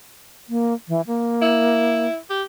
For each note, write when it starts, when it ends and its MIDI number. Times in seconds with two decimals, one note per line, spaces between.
0.49 0.74 58
0.88 1.01 52
1.07 2.07 58
1.42 2.16 64
2.30 2.43 67